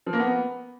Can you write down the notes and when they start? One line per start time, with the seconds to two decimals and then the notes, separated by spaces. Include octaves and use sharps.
0.06 F3
0.13 A#3
0.19 B3